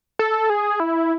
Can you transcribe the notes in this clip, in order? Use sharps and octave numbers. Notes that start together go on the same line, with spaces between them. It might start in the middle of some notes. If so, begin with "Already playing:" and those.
A4
G#4
E4